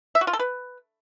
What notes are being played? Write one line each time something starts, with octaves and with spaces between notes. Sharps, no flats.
E5
F#4
F4
A4
B4